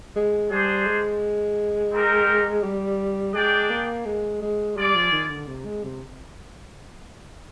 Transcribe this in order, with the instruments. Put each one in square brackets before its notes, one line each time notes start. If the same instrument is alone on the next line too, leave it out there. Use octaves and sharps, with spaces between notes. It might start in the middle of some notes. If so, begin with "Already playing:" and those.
[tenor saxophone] G#3
[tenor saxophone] G3 [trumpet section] D4 G#4 C5
[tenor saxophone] G#3
[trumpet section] C4 D#4 G4 A#4
[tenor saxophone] G3
[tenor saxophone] G#3 [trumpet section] D4 G#4 D5 G5
[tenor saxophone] A#3
G#3
G#3
[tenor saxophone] G3 [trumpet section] F4 G#4 D5
[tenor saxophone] F3
D#3
D3
C3
G#3
C3